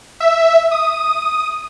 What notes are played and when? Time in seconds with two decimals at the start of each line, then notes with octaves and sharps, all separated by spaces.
0.20 E5
0.71 D#6